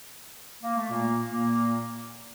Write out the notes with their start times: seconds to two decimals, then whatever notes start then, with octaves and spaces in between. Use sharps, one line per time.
0.62 A#3
0.76 A3
0.89 A#2 A#3
1.28 A#2 A#3